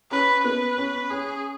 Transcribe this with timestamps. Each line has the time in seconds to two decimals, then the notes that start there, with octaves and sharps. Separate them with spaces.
0.11 C#4 B4
0.44 B3 B4
0.77 C#4
1.11 C#4 G#4